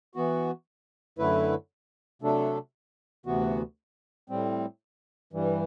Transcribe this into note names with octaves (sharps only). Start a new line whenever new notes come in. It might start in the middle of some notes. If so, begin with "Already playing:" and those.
E3 B3 F#4
F#2 D3 A3 E4 B4
C3 F#3 A3 D4 A4
D2 C3 E3 B3 F#4
A2 G3 C4
G2 E3 G3